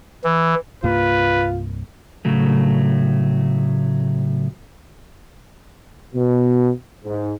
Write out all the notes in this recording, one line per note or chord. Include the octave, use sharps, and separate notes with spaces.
E3
C2 G2 A#3 F4 B4
A2 C#3 F#3 A3
B2
G#2